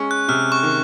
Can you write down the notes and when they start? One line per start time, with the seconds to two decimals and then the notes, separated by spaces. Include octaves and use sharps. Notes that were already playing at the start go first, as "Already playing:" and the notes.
Already playing: G#3 C#4
0.11 F#6
0.28 C3 F6
0.52 C#6
0.63 D#3